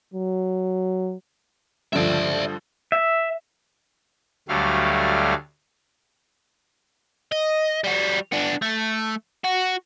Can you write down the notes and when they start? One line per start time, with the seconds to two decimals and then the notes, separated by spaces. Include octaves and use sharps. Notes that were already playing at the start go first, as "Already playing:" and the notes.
0.14 F#3
1.93 G2 D3 F3 D5 E5
2.92 E5
4.48 D2 F#3 G3 A3 F5
7.32 D#5
7.84 G3 F#4
8.32 B3 D4
8.62 A3
9.45 F#4